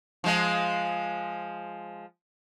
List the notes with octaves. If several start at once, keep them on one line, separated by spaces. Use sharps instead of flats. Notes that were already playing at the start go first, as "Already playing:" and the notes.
F3 G#3